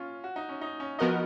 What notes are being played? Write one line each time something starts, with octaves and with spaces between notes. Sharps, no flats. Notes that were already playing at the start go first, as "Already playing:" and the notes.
Already playing: C#4 F4
F#4
D#4
C#4
D#4
C#4
F3 B3 D#4 F#4 A#4 D#5